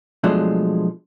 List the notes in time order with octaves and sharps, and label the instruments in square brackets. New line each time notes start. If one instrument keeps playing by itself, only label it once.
[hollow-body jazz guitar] B2 F3 F#3 G#3 A3 D4